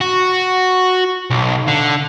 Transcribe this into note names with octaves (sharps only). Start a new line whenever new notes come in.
F#4
B1
D3